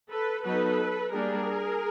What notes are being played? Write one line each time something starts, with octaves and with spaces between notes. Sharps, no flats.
A4 B4
F#3 B3 D#4 A4 B4
G3 A#3 D4 G#4 A#4